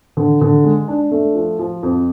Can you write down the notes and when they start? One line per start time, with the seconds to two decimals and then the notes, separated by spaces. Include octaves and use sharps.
0.17 D3
0.41 D3
0.64 G#3
0.88 D4
1.11 A3
1.35 F3
1.59 F3
1.83 F2